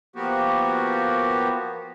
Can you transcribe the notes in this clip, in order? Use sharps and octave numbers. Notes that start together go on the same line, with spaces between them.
F3 A#3 B3 F#4 G4